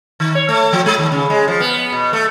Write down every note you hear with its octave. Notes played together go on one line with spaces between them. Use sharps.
D#3
C#5
A3
F3
G#3
D#2
C#3
G#3
F3
B3
B2
A3